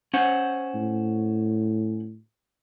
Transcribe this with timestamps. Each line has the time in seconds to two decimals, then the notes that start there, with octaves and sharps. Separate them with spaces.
0.14 C#4 C5 F#5
0.75 A2